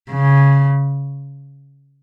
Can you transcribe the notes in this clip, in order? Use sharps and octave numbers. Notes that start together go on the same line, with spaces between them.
C#3